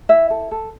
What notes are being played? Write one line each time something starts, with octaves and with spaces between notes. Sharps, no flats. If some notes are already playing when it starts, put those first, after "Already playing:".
E4 E5
A4
A4